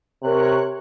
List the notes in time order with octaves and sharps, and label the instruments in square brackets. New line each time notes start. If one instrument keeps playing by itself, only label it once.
[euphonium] C3 [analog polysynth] A#4 C#5 F#6